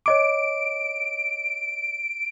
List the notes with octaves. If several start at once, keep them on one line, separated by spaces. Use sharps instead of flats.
C#5 D#5 D6 D7